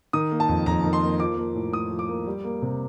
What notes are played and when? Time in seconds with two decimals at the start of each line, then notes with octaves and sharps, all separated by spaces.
0.13 D#3 D#6
0.31 A#3
0.40 A5
0.49 F2
0.66 F2 A#5
0.84 D#3
0.93 C6
1.02 A#3
1.20 F3 D6
1.37 A#3
1.54 A2
1.72 A2 D#6
1.91 F3
1.99 D6
2.08 A#3
2.26 G3
2.44 A#3
2.62 C3